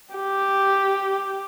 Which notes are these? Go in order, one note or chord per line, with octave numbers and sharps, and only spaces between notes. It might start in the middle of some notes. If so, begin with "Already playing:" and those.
G4